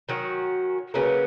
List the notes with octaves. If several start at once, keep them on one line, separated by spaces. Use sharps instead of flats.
D#3 F#3 C#4 F#4
C#3 F#3 A#3 C#4 B4